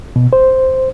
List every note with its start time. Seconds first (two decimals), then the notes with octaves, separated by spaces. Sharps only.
0.16 B2
0.33 C5